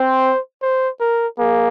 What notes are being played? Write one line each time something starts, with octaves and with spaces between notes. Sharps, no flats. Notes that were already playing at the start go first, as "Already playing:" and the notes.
Already playing: C4 C5
C5
A#4
A#3 G#4